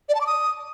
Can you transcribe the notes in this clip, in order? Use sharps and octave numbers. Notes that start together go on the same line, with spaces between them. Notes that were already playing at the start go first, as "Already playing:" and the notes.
D5
A5
D6
D#6